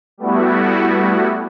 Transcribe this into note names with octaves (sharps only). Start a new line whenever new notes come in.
G3 A3 B3 E4 F#4